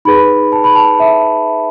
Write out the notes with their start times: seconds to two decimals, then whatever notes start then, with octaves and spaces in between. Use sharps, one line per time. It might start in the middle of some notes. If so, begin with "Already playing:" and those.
0.05 D#4 G#4 B4 B5
0.52 A5
0.64 B5
0.75 A5
1.00 E5